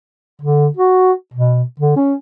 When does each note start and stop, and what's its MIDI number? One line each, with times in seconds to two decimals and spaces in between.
0.42 0.67 50
0.77 1.12 66
1.34 1.63 47
1.79 1.96 50
1.96 2.14 61